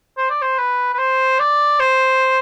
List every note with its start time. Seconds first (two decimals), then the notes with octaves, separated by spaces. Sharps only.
0.18 C5
0.30 D5
0.42 C5
0.59 B4
0.94 B4
0.99 C5
1.39 D5
1.80 C5